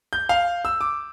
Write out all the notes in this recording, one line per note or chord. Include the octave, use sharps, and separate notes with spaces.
G6
F5
E6
D6